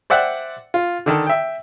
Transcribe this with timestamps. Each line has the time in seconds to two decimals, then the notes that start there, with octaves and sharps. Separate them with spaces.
0.10 C5 D5 E5 F#5 G5
0.74 F4
1.06 D3 D#3 A4
1.27 E5 G5